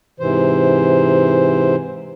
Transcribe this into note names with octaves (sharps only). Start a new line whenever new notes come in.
G#2 C3 E3 C5